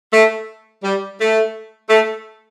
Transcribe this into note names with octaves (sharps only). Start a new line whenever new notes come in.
A3
G3
A3
A3